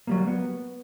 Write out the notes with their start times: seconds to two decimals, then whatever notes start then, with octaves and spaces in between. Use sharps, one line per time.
0.07 F#3 G3 A#3
0.27 B3